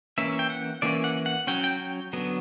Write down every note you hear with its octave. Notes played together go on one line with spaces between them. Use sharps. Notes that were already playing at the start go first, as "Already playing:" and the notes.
E3 A#3 C#4 E5
G5
F#5
E3 A#3 C#4 D5
F#5
F#5
F#3 C#4 G5
G5
G5
D3 F#3 B3